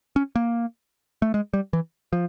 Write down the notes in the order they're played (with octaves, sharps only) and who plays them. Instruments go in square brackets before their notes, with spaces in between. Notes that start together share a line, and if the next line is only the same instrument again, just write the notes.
[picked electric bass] C#4
A#3
A3
G#3
G3
E3
F3